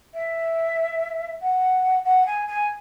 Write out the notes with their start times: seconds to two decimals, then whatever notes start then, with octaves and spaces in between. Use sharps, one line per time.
0.14 E5
1.42 F#5
2.05 F#5
2.26 G#5
2.47 G#5